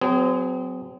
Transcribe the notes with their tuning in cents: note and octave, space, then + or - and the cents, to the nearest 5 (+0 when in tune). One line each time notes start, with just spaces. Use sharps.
F#3 +0 C4 -40 G#4 +0